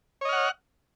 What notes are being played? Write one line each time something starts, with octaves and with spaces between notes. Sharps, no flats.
C#5 D#5 F#5 F6